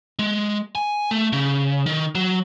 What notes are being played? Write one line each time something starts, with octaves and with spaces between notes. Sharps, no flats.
G#3
G#5
A3
C#3
D#3
F#3